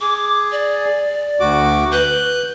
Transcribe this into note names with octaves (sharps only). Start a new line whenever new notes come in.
G#4 D6
D5
D2 F#4 D6
B4 F#6 G6